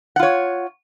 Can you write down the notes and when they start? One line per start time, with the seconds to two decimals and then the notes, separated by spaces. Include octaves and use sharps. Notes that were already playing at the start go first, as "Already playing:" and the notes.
0.16 F#5
0.19 F4
0.23 C#5